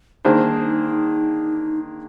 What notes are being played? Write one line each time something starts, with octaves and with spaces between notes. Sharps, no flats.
D#3 A#3 D4 D#4 G#4 C5